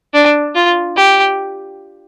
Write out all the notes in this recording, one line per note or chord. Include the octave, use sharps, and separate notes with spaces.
D4
F4
G4